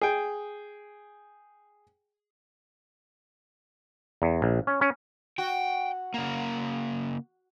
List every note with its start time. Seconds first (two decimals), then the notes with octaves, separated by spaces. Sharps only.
0.02 G#4 G5
4.22 E2
4.42 A#1
4.67 C#4
4.81 C#4
5.38 F#4 G5
6.14 C#3 A#3